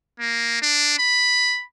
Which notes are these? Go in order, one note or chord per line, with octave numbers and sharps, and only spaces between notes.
A#3
D4
B5